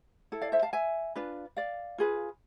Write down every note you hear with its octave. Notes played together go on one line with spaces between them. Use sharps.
E4 A4
D5 F5
C5 E5
F5 A5
E5 G#5
D4 F4 B4
D5 F5
F4 G#4 B4